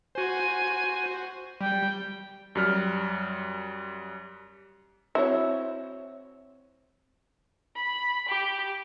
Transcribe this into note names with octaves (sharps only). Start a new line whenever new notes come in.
F#4 C5 G#5
G3 G5
F#2 G3 F6
C4 E4 F#4 C#5
B5
G4